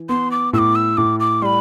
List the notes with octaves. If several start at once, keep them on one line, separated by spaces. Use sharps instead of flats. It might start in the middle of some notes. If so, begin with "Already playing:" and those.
Already playing: E3
B3 C6
D6
A2 E6
D6
E6
A2 D6
D6
G3 B5 C6